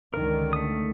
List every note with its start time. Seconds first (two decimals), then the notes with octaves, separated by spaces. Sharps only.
0.14 C#2 D3 D#3 A#4
0.53 A3 D#6